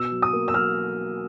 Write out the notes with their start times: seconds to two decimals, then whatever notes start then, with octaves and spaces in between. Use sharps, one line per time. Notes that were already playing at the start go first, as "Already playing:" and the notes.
Already playing: B2 E6
0.11 F#3
0.22 D#6
0.33 A#3
0.48 E6
0.54 F#3 F6